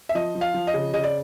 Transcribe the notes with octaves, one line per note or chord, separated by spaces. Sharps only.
E5
F3 D#5
F3
F5
F3
D#5
C#3
C#3 D#5
D5